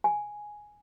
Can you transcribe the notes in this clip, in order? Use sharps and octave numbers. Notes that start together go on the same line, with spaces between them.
G#5